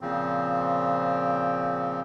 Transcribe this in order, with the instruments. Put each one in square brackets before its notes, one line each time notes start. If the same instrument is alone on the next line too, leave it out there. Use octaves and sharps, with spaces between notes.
[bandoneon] A#2 C#3 F3 C4